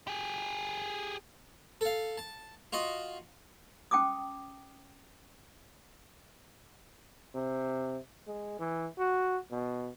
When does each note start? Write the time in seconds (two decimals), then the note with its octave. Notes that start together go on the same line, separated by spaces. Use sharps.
0.07 G4 G#4
1.81 A4 F5
2.18 A5
2.73 F4 F#4 D#5
3.91 C#4 G5 A5 D6 D#6
7.35 C3
8.27 G#3
8.59 E3
8.99 F#4
9.51 B2